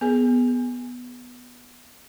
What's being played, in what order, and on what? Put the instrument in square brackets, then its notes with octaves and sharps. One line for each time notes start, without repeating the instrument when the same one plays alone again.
[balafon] B3 G#4